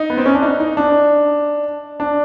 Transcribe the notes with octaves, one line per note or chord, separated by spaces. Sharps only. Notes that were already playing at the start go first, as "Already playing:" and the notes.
Already playing: D#4
B3
C4
C#4
D4
D#4
D#4
D4
D4